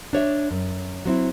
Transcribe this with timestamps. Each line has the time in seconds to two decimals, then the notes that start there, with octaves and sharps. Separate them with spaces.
0.13 D4 C#5 E5
0.51 F#2
1.05 F#3 C4 E4